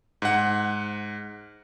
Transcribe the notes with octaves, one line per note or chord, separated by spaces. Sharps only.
G#2 F#5